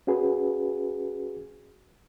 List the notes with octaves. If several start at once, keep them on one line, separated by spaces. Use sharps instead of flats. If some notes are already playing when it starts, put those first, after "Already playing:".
C#4 F#4 G#4 B4